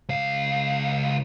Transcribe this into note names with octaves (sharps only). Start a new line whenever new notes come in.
C#2 F5